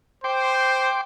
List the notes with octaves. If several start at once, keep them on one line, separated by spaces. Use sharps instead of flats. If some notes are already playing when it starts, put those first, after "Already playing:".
C5 G5 C6 D6